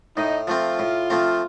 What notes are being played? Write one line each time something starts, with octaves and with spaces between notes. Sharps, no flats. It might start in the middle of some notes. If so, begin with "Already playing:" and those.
A2 D#4
F3 A3 C4 F4
A2
F3 A3 C4